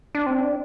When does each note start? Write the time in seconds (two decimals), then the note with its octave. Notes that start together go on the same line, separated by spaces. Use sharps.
0.15 D4
0.26 C4
0.41 D4